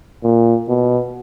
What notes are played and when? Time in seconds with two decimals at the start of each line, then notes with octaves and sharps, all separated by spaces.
0.23 A#2
0.68 B2